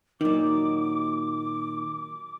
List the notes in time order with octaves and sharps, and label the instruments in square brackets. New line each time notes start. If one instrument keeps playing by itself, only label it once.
[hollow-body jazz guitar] A#2 D#3 [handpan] F#3 D#4 [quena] D6